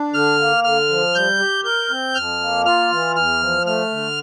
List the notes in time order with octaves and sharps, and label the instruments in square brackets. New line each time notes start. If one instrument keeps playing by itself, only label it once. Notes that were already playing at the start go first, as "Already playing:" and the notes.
Already playing: [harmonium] D4
[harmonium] D3 [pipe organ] F6
[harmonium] A#3
[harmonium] D3 [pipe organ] F6
[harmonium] F3
[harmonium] G3 [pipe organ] G6
[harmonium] G4
[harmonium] A#4 [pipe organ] G6
[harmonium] C4
[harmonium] F2 [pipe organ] F6
[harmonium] A#3
[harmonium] F4 [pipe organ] F6
[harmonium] E3
[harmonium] E2 [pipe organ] F6
[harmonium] F3
[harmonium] A3 [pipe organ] F6
[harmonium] D3